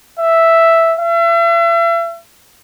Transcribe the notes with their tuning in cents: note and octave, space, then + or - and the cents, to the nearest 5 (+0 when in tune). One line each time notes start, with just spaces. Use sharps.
E5 +0
E5 +40